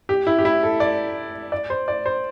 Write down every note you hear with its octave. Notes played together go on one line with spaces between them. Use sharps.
G4
E4
G4
E4
A4
D5
D5
C5
D5
C5